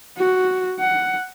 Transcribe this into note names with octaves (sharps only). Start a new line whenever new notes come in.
F#4
F#5